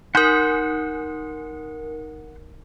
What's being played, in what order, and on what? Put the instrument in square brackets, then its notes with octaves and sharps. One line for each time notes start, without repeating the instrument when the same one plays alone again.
[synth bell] D#4 A#4 [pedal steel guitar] F#5 C6 G6